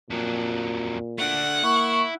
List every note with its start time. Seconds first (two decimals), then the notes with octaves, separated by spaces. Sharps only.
0.10 F2 A#2 F#3
1.18 A3 D4 F#5
1.63 A#3 E4 C#6